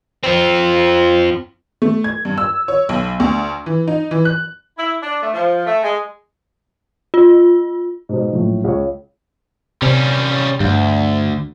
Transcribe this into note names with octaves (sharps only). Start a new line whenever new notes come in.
C4 F4
A3
G#6
G2
E6
C#5
B1
D2
E3
D#4
E3
F#6
E4
D4
A3
F3
A3
G#3
F4
G#2 B2
A#1 F#2 A2
C#2 C#5
C3 G3 C#4
D2 G2